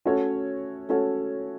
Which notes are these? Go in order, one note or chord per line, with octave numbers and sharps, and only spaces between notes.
A3 C#4 F#4 A4 C#5
A3 C#4 F#4 A4 C#5